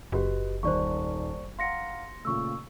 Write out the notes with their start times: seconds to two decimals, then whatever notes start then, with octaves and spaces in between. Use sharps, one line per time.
0.12 F#1 F#4 G4 B4 D#5
0.63 D#1 D#3 C5 D5 C#6
1.59 F5 F#5 A#5 C6 A#6 C#7
2.25 A#2 C#3 A3 C#6 E6